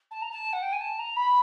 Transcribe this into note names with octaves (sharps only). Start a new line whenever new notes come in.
A5
A#5
A5
F#5
G5
G#5
A5
A#5
B5